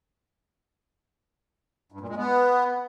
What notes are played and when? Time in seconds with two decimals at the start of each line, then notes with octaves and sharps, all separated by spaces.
1.92 G2
2.01 A#2
2.09 G#3
2.17 B3